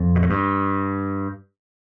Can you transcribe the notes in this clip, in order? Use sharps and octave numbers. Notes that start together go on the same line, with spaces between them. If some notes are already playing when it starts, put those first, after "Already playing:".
Already playing: F2
B2
A2
G2